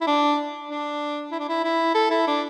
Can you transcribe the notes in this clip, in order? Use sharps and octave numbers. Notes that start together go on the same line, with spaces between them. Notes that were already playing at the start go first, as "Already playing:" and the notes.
E4
D4
D4
E4
D4
E4
E4
A4
E4
D4